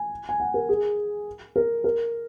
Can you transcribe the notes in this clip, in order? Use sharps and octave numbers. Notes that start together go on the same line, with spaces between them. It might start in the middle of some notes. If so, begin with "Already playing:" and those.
Already playing: G#5
G#5
F#5
A#4
G#4
A#4
A#4